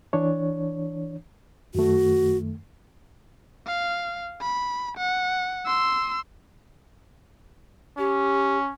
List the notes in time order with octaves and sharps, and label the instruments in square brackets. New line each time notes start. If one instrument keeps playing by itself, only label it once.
[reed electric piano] E3 D4 C#5
[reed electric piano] F#2 D#3 A3 [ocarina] F#4
[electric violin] F5
B5
F#5
C6 E6
[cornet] C#4 [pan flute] G4